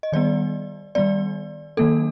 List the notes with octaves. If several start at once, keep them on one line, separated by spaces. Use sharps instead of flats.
D#5
D#3 G3 B3 D5
D#3 G3 B3 D5
D#3 F#3 A#3 D4 A4